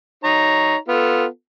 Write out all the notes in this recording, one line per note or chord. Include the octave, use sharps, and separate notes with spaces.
D#4 C#5 A#5
B3 F4 A4